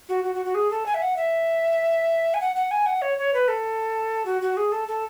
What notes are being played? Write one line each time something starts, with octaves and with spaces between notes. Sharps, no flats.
F#4
F#4
F#4
F#4
G#4
A4
G#5
E5
F#5
E5
G#5
F#5
F#5
G#5
F#5
C#5
C#5
B4
A4
F#4
F#4
G#4
A4
A4